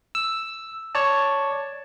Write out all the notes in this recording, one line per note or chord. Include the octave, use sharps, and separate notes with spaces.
E6
C#5 D5 A5